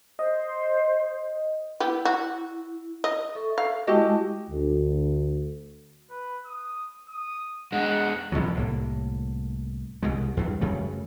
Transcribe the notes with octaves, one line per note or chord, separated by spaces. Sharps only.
C5 D#5
B3 E4 G4
F#4
D#5
A4 E5 C#6
F5
G#3 E4 F#4 G4 D#5 A5
D2
B4
D#6
D#6
G#3 D4 F#5
A1 B2 F3 F#3
C2 A2 A#3
C2 B2 G#3
E2 G2
F#2 C#3 E3 A3